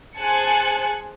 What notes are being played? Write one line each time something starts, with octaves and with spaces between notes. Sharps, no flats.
G#4 C5 G#5 A5 F#6 C#7